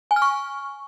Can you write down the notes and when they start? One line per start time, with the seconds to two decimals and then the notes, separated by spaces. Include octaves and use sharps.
0.11 G#5
0.16 F6
0.22 C#6